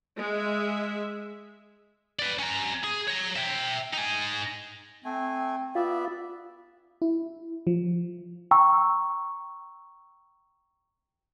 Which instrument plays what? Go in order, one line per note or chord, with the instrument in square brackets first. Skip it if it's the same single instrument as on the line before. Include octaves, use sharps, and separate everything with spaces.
[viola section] G#3 E5
[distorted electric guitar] B4 D5
C#4 A#5
G#4
C#5 A#5
E5 G5
D#4 G#5
[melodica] A3 G#5 [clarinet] C4
[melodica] B3 D5 E5 [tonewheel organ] F4
[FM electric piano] E4
F3
[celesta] G5 A#5 C#6 E6